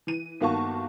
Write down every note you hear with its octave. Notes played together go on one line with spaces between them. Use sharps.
E3 D#7
G1 D#3 A#3 F#4 A5 C#6